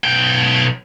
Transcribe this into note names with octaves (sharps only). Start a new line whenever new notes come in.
B1 G5